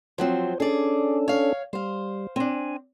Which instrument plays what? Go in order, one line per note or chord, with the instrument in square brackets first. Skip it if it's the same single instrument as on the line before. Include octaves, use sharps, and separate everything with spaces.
[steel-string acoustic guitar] F3 F#3 C4 [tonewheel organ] C5
[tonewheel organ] C#4 D4 A4 [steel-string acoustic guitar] G#4 D5
[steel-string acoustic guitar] C#5 F5
[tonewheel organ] G3 [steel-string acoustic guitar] C5 F5
[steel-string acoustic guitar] C4 D4 [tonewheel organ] G#5